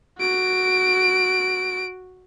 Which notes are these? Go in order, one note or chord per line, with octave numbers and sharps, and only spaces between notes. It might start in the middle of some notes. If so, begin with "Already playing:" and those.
F#4 D7